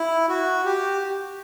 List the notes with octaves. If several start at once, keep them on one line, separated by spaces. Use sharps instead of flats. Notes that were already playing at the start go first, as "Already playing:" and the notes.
Already playing: E4
F#4
G4